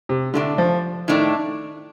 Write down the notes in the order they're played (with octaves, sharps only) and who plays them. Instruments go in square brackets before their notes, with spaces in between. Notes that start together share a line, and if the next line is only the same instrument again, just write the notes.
[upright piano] C3
[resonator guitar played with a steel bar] A2 A3 D4 [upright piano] D3
[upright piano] F3
[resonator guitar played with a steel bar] A2 A3 D4 [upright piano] D#3